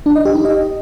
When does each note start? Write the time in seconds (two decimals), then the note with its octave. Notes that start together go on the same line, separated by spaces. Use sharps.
0.06 D4
0.16 D#5
0.25 G4
0.35 D#4
0.45 D#5